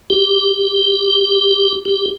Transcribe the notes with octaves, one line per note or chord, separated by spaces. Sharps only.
G4
G4